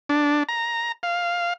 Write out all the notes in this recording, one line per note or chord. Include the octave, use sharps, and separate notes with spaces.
D4
A#5
F5